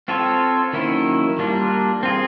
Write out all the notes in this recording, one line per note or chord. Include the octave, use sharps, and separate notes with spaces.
C4 F4 A4 C#5
D#3 F#3 A#3 C#4 E4
G3 A#3 D4 F4
C4 F4 G#4